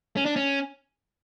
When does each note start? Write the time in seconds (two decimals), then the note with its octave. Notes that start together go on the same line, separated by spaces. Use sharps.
0.17 C#4
0.26 D4
0.36 C#4